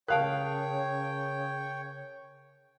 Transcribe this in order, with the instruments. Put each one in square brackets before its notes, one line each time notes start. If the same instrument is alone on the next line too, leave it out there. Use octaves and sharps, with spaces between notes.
[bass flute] C#3 [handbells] A#4 A5 [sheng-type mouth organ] C#5 G5 [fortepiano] F5 F#6